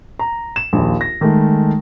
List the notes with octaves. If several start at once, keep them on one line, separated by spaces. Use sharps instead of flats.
A#5
E7
A#1 D#2
A#6
D#3 G#3 A3